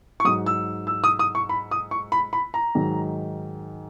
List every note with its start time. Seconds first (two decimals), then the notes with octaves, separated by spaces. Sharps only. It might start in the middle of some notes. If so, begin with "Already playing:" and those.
0.20 C#6
0.24 G#2 F#3 D#6
0.46 E6
0.87 E6
1.04 D#6
1.19 D#6
1.35 C#6
1.49 B5
1.71 D#6
1.91 C#6
2.12 B5
2.33 B5
2.54 A#5
2.75 G#2 D#3 F#3